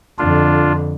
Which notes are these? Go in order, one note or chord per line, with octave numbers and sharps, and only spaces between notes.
F2 D3 D4 F4